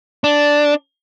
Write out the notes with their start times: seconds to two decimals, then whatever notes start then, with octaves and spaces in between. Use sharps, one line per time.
0.24 D4